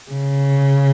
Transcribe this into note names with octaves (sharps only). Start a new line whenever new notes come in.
C#3